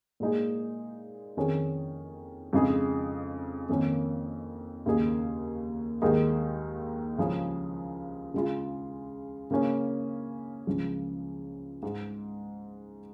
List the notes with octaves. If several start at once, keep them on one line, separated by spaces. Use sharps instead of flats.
A#2 G#3 D#4 G#4
F2 D#3 C#4 G#4
F2 C#3 G#3 D#4 G#4
F2 D#3 A#3 C#4
D#2 C#3 A#3 D#4 G#4
D#2 D#3 G#3 D#4 G#4
C#2 C#3 F3 C#4 G#4
C#3 G#3 F4
C#3 A#3 C#4
C#2 C#3 F3 G#3
G#2 G#3 D#4